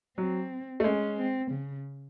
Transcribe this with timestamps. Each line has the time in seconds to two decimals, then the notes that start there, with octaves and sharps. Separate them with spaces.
0.18 F#3 C4
0.80 A3
0.84 G#3 C#4
1.17 C4
1.51 C#3